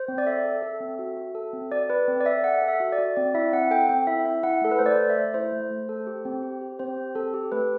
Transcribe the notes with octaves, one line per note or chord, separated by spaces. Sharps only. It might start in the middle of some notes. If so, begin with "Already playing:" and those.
Already playing: C5
C4
D5
A4 E5
A4
A4
C4
F#4
F#4
A4
C4
F#4 D5
A4 B4
C4
D5
A4 E5
A4 F#5
A4
E5
F#4
D5
F#4
C4 D5
E4 E5
C4 F#5
A4 G5
C4 G5
E4 E5
E4 E5
E4 F#5
A3 A4
B4
A3 C5
D5
A3
E5
A3
E4 C5
A3
A3
A4
G4
C4
G4
G4
C4 C5
G4
C4 A4
G4
A3 B4